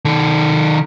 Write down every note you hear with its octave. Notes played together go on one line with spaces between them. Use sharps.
D#3 A4